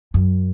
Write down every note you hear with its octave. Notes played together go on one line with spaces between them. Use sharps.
F#2